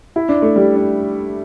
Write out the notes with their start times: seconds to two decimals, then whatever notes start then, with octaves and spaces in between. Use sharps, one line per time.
0.16 E4
0.29 D4
0.42 A3
0.56 G3
0.76 D4